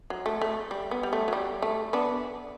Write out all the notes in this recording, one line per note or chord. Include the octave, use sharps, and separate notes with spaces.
F#3
A3
A3
G3
B3
G3
A3
F#3
G3
A3
B3 D4